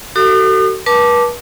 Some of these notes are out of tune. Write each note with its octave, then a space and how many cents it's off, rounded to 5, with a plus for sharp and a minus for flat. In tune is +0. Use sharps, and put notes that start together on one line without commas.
F#4 +40 A4 +35 D#6 -45
B4 -40 A5 -5 D6 +0